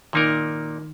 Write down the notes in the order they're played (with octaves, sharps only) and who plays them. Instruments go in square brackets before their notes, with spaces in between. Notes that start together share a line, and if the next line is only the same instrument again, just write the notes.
[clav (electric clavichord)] A#2 A#3 D#4 A#4 [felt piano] D#3